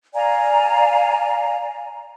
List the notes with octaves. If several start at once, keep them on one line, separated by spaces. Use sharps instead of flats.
D5 F5 G#5 A#5